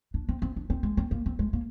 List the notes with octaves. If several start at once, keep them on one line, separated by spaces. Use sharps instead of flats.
D4
C4
C4
D4
C4
G#3
C4
A#3
C4
G#3
A#3